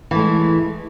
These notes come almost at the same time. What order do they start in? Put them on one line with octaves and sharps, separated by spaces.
E3 A3 G#3